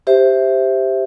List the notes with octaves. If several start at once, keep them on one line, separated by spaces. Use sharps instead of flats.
G4 C5 E5